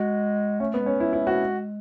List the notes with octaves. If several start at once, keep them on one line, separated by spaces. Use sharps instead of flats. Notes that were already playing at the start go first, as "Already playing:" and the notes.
Already playing: G#3 F#4
A3 C#4
B3
G#3
C#4
A3
G#3 E4
E4
F#4